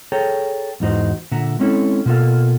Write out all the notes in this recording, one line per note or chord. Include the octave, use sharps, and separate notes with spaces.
G#4 A4 C#5 G5 A#5
E2 G#2 E3 D#4 F#4 C5
A#2 D3 A#3 E5 F#5 A#5
G#3 C4 C#4 E4 A4
B2 A#3 E4 F4 A4 F5